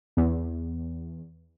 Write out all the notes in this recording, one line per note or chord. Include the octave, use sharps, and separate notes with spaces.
E2